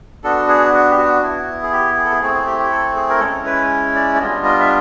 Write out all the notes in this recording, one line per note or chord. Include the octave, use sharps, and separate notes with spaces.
B3 D4 F#4 A4
G#4
F#4
G4
F#4
B3 E4
G#4
G4
G#4
A4
G#4
A3 C4 E4 G#4
G#4
G4
G4
A4
G#4
A#4
G#3 C#4 E4 A4
B4
D5
D5
G3 B3 D4 F4 D#5
D#5
E5